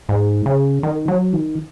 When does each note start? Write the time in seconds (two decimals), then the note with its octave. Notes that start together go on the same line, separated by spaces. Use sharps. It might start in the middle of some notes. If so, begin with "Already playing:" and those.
0.09 G#2
0.46 C#3
0.83 D#3
1.08 F#3
1.33 D#3